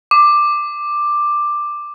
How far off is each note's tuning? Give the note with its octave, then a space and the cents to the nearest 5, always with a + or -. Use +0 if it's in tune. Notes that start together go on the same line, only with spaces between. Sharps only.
D6 +10